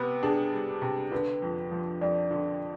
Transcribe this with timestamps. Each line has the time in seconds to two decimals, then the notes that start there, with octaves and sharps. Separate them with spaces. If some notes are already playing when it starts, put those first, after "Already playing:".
Already playing: C3 B3 B4
0.23 D4 G#4
0.52 G3
0.82 C3
1.11 D3 B4
1.42 F2
1.71 F3
2.01 F2 D5
2.31 D3